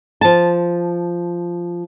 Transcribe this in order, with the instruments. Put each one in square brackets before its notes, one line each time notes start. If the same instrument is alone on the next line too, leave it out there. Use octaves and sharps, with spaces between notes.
[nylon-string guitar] F3 A5